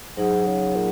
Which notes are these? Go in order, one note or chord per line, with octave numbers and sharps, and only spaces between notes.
G#2 F#3 D#4 G#4 F#5
C#3
A#2